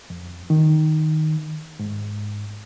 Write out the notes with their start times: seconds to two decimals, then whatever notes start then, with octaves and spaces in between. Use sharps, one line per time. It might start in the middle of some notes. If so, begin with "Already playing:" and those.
0.10 F2
0.50 D#3
1.79 G#2